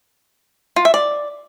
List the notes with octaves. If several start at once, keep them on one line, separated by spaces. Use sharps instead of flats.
F4
E5
D5